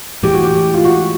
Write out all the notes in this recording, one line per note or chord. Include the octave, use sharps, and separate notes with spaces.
A2 E3 G#3 G4
F#4
G4
F4
F#4